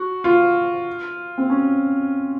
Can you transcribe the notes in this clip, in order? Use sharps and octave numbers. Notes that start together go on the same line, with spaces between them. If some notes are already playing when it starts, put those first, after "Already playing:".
Already playing: F#4
F4
C4
C#4